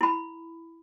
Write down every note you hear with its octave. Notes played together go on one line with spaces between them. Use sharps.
E4 B5